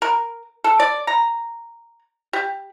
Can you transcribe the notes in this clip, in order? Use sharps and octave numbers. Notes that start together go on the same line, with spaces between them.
A#4
A4
D5
A#5
G4